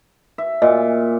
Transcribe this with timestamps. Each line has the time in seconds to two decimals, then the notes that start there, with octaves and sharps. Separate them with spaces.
0.38 E5
0.62 A#2 D#5